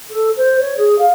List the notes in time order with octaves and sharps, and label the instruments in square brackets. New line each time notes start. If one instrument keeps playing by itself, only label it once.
[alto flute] A4
C5
C#5
G#4
F5